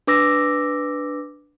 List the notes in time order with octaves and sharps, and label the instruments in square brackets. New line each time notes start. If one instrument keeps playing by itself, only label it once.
[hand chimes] D4 B4 D6 E6 A#6